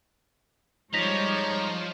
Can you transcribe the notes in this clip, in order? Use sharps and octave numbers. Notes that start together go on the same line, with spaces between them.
F3 G3 G#3 D#4 C#5 A#6 B6 F7